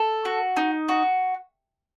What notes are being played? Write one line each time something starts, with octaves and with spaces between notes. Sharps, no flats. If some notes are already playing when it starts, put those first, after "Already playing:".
Already playing: A4
F#4
D#4
F#4